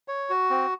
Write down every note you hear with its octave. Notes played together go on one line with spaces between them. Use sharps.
C#5
F#4
C4